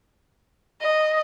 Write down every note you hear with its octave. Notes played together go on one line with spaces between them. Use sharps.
D#5